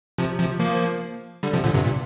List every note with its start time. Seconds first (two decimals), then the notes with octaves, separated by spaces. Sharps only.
0.18 C3 F3
0.39 C3 F3
0.60 F3 A#3
1.43 D3 G3
1.53 C3 F3
1.64 A#2 D3
1.74 G2 C3
1.84 A#2